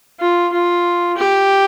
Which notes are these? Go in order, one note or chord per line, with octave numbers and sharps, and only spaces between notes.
F4
F4
G4